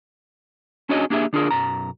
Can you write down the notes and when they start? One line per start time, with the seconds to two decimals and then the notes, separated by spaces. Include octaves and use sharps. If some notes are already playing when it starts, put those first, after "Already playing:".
0.89 C#4 D4 F#4 G#4 C#5 D#5
1.10 A#3 D4 G4 G#4 E5
1.33 D3 D4 F4 G#4 A#4
1.51 B1 F#2 A#5